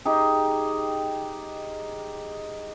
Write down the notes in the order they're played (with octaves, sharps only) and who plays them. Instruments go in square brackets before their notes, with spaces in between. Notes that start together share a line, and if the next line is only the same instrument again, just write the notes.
[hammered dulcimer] D#4 G4 G#4